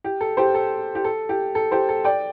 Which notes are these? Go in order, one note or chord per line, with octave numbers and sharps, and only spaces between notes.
G4
A4
G4 C5
A4
G4
A4
G4
A4
G4 C5
A4
D5 G5